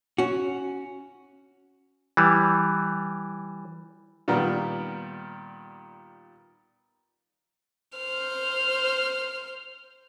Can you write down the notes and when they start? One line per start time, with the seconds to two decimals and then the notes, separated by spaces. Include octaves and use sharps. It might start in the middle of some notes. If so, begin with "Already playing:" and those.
0.18 C#4 F#4
2.17 E3 G3
4.28 A#2 D#3 G3 B3
7.97 C5 F6